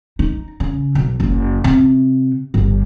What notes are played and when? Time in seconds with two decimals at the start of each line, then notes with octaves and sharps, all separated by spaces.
0.19 D#4
0.60 C#3
0.95 B1
1.20 F#1
1.64 C3
2.54 G1